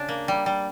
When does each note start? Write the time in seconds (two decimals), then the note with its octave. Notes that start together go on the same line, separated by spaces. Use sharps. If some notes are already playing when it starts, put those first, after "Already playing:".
Already playing: C#3 D4
0.09 A#3
0.28 G3
0.46 G3